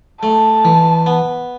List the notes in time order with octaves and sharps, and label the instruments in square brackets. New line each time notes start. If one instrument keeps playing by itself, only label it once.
[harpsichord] A3 [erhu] A5
[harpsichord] E3
B3